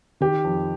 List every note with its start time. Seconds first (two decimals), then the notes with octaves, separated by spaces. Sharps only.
0.21 D#3 G4
0.44 F2